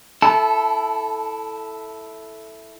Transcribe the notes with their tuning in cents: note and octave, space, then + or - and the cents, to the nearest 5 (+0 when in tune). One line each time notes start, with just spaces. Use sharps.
E4 +0 A4 +0 A5 -30